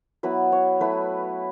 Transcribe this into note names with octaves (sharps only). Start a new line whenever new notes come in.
F#3 B3 E4 B4
C#5
F#3 A3 E4 B4